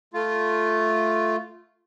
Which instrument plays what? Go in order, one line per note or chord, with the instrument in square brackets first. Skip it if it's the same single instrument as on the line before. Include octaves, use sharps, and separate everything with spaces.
[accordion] A3 F4